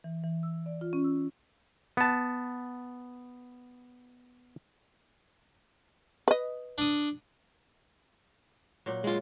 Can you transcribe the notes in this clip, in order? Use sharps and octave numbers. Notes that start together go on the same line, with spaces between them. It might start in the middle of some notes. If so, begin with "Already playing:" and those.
E3
E3
E6
D5
F4
C#4
E6
B3 A5
B4 D#5
D4 D#6
A#2 F#3
G#3 F4